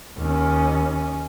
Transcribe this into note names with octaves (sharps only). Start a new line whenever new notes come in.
D#2 C#4